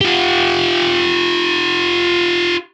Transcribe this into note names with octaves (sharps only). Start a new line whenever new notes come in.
F4 G4